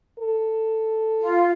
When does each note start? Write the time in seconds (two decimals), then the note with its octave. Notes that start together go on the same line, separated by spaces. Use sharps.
0.19 A4
1.20 F4